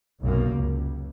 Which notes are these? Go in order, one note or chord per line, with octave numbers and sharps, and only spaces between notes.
F1 B1 F#2 A#3
C#2